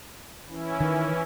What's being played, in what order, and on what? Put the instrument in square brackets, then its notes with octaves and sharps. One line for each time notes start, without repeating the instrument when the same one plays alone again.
[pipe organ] E3 C#4 E4
[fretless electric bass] D#3